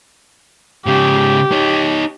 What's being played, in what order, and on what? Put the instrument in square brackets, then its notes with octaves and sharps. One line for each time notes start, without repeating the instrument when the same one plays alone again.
[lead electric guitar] G#2 C#3 [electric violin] G4
[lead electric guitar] D#4 C#5